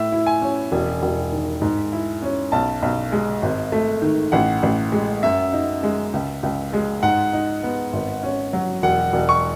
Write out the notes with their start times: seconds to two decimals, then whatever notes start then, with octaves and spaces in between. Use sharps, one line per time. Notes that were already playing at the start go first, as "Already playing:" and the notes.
Already playing: A2 E5
0.12 E4
0.27 G#5
0.42 C#4
0.72 E1
1.02 E1
1.32 D#3
1.61 G#2
1.92 E4
2.22 C#4
2.52 B1 A5
2.82 B1
3.12 G#3
3.42 G#1
3.72 A3
4.02 D#3
4.32 A1 F#5
4.63 A1
4.92 G#3
5.23 F#2 E5
5.53 D#4
5.83 G#3
6.13 C#2
6.43 C#2
6.73 G#3
7.03 G#2 F#5
7.33 D#4
7.63 B3
7.93 G#1
8.23 C#4
8.53 F#3
8.83 E1 F#5
9.13 E1
9.29 C#6